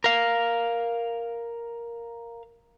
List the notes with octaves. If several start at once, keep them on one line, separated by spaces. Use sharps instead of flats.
A#4 F5